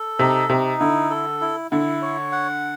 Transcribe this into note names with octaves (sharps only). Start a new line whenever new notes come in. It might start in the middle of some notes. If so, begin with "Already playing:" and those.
Already playing: A4
C3 D#4
C3 D#4
D3 E4
A4
E4
D3 E4
C#5
F#5